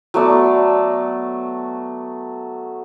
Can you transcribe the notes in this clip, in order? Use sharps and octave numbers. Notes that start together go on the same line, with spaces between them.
F#3 A3 B3 D5